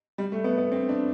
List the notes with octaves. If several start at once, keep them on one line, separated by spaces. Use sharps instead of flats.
G3
A3
B3
B3
C4
D4